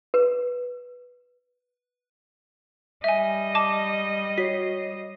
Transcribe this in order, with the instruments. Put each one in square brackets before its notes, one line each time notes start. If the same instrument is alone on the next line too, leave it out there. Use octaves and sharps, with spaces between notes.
[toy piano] B4
[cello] G3 D#5 [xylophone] E5 G#5
[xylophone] A5 D6
[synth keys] F#4 C#5 C7 [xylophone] B6